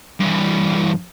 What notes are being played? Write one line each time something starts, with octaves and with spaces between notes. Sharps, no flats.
G2 E3